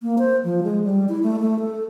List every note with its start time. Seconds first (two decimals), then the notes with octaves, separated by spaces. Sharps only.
0.02 A#3
0.19 C5
0.44 F3
0.63 G#3
0.84 G3
1.09 E4
1.23 A3
1.39 A3
1.60 A4